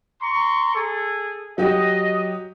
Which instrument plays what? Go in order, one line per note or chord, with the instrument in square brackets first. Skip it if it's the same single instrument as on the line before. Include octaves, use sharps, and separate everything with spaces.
[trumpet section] A#5 C6 C#6
G#4 A4
[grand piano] F#3 F#4 G4 [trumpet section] D#5